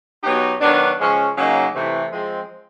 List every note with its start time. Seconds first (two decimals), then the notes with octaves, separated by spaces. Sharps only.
0.24 B2 F#3 B3 D#4 G4
0.61 D#3 F#3 B3 D4
0.99 C#3 F3 G#3 C#4
1.36 C#3 F#3 A#3 D#4
1.74 C3 E3 A3
2.12 F3 G#3 C4